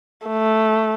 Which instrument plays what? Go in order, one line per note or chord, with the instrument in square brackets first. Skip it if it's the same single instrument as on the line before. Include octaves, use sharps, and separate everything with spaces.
[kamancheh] A3